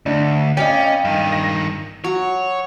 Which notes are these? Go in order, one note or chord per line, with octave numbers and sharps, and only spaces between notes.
D2 D4
C#4 D5 D#5 F5 G5 B5
G2 D#3
A#6
F#3 C#5 A#5